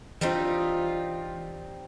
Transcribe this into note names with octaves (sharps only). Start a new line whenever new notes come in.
E3 G3 C4 D4 D#4 F4